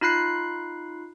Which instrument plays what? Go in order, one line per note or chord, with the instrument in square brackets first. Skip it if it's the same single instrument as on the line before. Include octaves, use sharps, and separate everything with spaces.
[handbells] D#4 F4 B5 F#6 C7